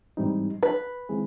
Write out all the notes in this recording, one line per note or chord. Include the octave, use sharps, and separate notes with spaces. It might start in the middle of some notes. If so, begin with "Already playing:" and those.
G#2 E3 G3 C4 D#4
B4
D#3 G#3 C4 E4 G#4